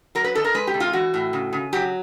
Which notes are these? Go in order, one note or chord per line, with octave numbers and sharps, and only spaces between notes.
F#3 A#4
B4
D#3 A4
A#4
G#3 B4
G4
C3
F4
E3 F#4
A2
C#3
C#3
F#3 G4